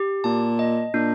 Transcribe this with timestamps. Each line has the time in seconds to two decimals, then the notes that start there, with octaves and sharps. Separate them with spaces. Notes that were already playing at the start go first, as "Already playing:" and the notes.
Already playing: G4
0.24 A#2 A5
0.59 D#5
0.94 A#2 D4